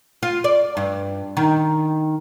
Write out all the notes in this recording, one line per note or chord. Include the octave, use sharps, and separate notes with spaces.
F4
D5
G2
D#3